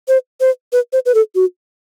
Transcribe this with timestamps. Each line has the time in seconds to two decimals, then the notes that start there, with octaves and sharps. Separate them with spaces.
0.08 C5
0.40 C5
0.73 B4
0.93 C5
1.06 B4
1.14 A4
1.35 F#4